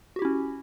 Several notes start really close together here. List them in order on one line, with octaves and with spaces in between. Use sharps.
F#4 G4 E4 C#4